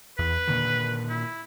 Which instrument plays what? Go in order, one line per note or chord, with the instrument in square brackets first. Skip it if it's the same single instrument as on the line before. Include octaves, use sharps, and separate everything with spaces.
[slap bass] E2 [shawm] B4
[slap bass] A#2 D3 D#3
[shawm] E4